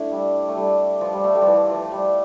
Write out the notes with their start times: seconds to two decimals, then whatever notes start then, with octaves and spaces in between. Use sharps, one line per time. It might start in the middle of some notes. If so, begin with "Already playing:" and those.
Already playing: A3 D4 E4
0.11 G3
0.49 A3
0.56 G3
1.01 F3
1.13 G3
1.24 A3
1.35 G3
1.42 F3
1.47 E3
1.70 F3
1.92 G3